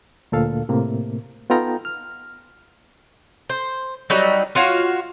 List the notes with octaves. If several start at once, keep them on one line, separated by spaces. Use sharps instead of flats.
D2 A#2 A4 F5
A2 C3 A#3
B3 D#4 F4 A4 G5 A#5
F6
C5
F#3 G3 D#4
F4 F#4 C#5 F5